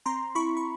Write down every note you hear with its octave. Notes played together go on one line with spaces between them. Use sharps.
C4 A#5 C6
E4 B5 C#6
C#6